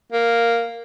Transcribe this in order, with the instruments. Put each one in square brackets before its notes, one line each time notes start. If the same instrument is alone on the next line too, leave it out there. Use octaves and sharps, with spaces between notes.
[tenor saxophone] A#3